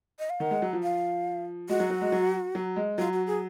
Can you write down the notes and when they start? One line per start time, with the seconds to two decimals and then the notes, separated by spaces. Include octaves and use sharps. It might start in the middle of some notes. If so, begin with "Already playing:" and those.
0.19 D#5
0.30 F5
0.40 D#3 F#5
0.51 G#3
0.62 F#3
0.73 F3
0.83 F5
1.69 G#3 F#4
1.80 F#3
1.90 F#3
2.01 G#3
2.12 F#3
2.55 F#3
2.76 G#3
2.98 F#3 F4
3.13 F#4
3.27 G#4